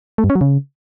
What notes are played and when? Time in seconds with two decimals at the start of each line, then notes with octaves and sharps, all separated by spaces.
0.18 A3
0.24 G2
0.30 C#4
0.35 F#3
0.41 C#3